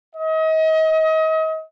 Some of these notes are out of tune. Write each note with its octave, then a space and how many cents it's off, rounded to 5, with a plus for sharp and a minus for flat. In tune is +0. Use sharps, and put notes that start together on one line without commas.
D#5 +35